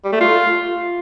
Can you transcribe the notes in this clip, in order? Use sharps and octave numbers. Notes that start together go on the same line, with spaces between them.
G3
A3
F4